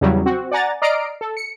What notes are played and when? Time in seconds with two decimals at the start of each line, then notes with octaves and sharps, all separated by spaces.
0.01 E2 C#3 F#3 G3
0.26 C4 F#4
0.52 D5 F#5 G#5 A#5 A6
0.82 D5 D#5 A#5 F6 C7 D7
1.21 A4
1.37 C#7